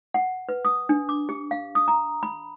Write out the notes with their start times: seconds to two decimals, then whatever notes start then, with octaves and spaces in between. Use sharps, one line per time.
0.14 F#5
0.49 B4
0.65 D#6
0.89 D4
1.09 D6
1.29 G4
1.51 F5
1.75 D#6
1.88 A#5
2.23 B5